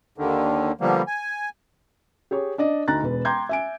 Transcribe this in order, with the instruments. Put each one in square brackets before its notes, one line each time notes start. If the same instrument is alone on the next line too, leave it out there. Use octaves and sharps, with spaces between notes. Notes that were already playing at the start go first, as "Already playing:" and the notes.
[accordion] D#2 D3 D#3
D3 F3 G3 A#3 B3
G#5
[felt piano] G4 G#4 C#5
D4 D5 D#5
D2 D#4 A#5 F#6 A6
E1 B4
G5 A#5 C6 D6 G6 G#6
E5 G#5 D7